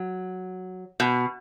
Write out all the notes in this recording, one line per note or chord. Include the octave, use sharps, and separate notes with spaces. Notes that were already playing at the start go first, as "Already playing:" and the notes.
Already playing: F#3
B2